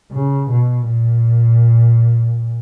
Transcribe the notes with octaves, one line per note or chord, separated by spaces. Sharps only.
C#3
B2
A#2